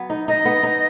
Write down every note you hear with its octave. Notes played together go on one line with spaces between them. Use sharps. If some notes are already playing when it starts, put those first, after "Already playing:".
Already playing: F#3 B3
D#4
D#4 D#5
B3
D#4